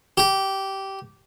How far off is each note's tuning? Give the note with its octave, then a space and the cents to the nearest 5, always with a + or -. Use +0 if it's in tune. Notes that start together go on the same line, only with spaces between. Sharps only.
G4 -15